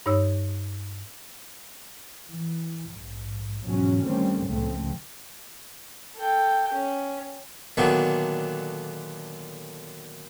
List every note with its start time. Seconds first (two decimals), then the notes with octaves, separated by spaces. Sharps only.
0.06 G2 D#4 C#5 E6
2.28 E3
2.91 A#1 G#2
3.62 E2 G#2 B2 F3 F#3 C#4
4.06 D3 D#3 G3 A3 C4 C#4
4.46 C#2 A#2 C#3 F3 A3 C4
6.16 A4 G5
6.73 C#4
7.77 A#2 D3 D#3 F#3 B3